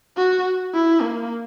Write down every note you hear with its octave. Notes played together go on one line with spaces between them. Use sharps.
F#4
E4
A#3